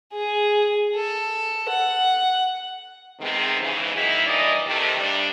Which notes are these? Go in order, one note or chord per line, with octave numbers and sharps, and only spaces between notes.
G#4
A4
F#5
C3 D#3 E3 G#3 B3 C4
G#2 C#3 E3
D#3 F#3 A#3 D#4 E4
G2 E3 A#3 D5 D#5
C3 D#3 A3
G2 G3 D4